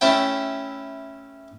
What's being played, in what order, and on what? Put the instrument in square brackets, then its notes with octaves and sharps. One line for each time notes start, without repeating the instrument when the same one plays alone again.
[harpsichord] A3 C#4 E4 G5